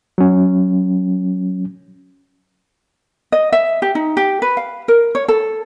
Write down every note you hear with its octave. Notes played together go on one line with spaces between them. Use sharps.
F#3 C#4
D#5
E5
G4
D#4
G4
B4
F5
A#4
C#5
A4